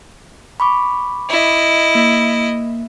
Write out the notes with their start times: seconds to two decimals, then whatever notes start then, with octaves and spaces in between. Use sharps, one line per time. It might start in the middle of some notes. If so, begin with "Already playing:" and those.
0.60 B5 C#6 D6
1.29 E4 D#5
1.95 A#3